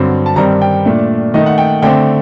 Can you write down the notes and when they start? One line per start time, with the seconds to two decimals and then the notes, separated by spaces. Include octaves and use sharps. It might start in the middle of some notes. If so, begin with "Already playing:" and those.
Already playing: G2 D3 F#3 C4
0.26 A5
0.36 G2 D#3 G3 C4 A#5
0.62 G5
0.85 A#2 A3 D4
1.34 D#3 A3 D#4 D#5
1.46 F#5
1.58 G5
1.82 D3 A3 C4 G5